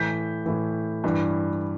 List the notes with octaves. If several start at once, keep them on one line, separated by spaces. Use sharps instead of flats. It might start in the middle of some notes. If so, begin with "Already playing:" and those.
Already playing: A2 E3 G6 B6
A2 E3
G2 E3